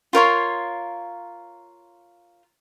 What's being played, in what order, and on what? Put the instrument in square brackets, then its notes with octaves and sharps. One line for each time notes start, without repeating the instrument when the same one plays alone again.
[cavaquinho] F4 A#4 C#5 C6